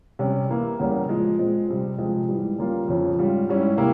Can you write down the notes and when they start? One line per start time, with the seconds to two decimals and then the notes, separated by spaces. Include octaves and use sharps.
0.19 C3 G3 C#4
0.49 E3 A#3 E4
0.79 E2 C#3 G3 A#3
1.09 A#2 F3 G#3
1.38 A#2 G#3 C4
1.68 C3 G3 C4
1.98 C3 F3 G#3
2.29 G#2 E3 G3
2.58 C#3 G3 A#3 F4
2.88 F2 C#3 F3
3.19 G#2 G3 C#4 F4
3.48 G#2 G3 C#4 E4
3.78 C3 G3 A#3 E4